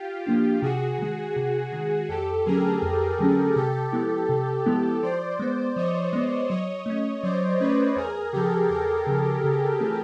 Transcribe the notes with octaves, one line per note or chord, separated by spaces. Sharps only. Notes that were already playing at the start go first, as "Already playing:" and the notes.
Already playing: F4 G4
F3 A#3 D4 G4
C3 F#4 G#4
D#3 G#3
C3
D#3 G#3
F2 G4 A4
D3 F#3 A3 C#4 G#4 A#4
F2
D3 F#3 A3 C#4
C3 G4 A4
F3 G#3 B3 E4
C3
F3 G#3 B3 E4
F3 C5 D5
G#3 B3
F3 C#5 D#5
G#3 B3
F#3 C#5 D#5
A3 C#4
F#3 C5 D5
A3 C#4 B4 C#5
E2 G#4 A#4
C#3 F3 G4 A4
E2 G#4 A#4
C#3 F3
C#3
E3 A3 C4 F4